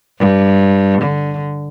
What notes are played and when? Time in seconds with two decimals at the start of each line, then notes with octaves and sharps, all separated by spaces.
0.19 G2
1.02 D3